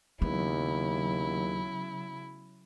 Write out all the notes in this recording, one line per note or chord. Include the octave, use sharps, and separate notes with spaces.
D#2 C#3 F#3 G#3 B3 E4